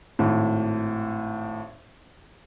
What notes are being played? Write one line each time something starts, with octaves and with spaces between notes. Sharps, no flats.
G#1 A2